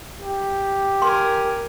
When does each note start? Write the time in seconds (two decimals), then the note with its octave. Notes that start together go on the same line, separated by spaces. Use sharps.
0.21 G4
1.02 A#4 G#5 C6